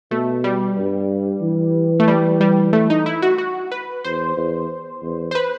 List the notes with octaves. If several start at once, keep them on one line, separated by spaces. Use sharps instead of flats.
B2 A3
G3
G2
E3
A3
G3
G3
A3
D#4
E4
F#4
F#4
B4
E2 C5
E2
E2
C5
B4